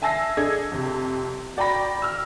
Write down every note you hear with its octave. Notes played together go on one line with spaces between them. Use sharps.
E5 G#5 A5 E6 A#6 C7
D4 G#4 A4 D#5 G#6
F2 C3
F#4 D5 G5 A#5 B5 A#6
E6 F6